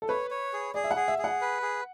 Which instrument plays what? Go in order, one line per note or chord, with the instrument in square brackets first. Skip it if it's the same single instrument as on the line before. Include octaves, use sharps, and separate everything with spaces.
[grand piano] A4
[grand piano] B4 [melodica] C#5
[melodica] C#5
G#4
[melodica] G#4 [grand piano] D5
[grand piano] E5
F#5
[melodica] G#4
[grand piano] E5
[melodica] G#4
[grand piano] F#5
[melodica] B4
G#4